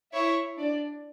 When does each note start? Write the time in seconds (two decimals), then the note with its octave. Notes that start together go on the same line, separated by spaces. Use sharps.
0.13 E4 C#5 E5
0.58 D4 D5